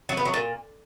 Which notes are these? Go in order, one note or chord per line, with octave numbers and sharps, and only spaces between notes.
F#3
B3
F#3
A#2